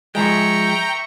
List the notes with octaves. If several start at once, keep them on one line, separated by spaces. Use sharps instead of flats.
F3 G#3 E5 G5 A#5 C#6